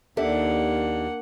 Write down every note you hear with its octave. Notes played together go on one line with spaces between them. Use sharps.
D#2 A#3 D4 G4 A4 E5 F#5